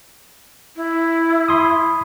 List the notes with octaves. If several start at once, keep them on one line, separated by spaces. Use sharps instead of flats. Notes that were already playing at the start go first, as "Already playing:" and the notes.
E4
B5 C6 D#6